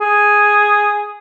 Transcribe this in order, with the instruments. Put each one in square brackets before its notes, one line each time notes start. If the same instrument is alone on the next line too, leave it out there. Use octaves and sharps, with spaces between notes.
[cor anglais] G#4